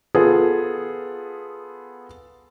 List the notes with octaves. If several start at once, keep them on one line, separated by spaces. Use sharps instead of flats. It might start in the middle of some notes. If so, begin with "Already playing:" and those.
B3 F4 G#4 A4